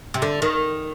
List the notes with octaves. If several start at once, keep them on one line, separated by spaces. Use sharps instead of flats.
C3
D3
D#3